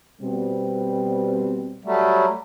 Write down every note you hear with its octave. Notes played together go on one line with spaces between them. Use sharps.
B2 G3 C4
F#3 G3 A3